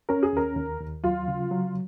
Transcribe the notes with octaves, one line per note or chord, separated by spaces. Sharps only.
C#4 A#4
G#4
D#2 A#4
D#2
D#2
F#3 F4
C#3
F#3